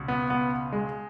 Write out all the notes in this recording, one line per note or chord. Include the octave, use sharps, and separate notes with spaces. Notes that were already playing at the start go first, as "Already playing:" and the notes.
Already playing: C#2 B2
B3
B3
G#3